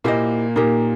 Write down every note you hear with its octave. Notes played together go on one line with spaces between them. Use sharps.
A#2 A#3 E4 G4 C5 D#5
A#2 A#3 D#4 G4 A#4